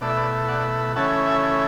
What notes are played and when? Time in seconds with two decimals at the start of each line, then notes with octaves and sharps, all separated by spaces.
0.01 B2 A3 E4 D5
0.09 E5
0.17 B4 D5
0.48 D5 F#5
0.96 C#3 E3 A3 C#4 E4 F#5 A5
1.27 E5 G#5